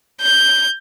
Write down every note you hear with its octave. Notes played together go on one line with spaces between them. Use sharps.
G6